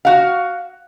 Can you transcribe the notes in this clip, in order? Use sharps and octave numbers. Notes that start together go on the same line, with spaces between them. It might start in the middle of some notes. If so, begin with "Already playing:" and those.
F#4 F5